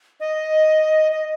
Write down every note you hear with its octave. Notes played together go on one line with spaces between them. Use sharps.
D#5
D#5